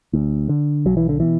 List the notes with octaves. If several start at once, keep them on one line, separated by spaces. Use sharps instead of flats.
D2
D3
B1 F#3
E3
D3
B2 E3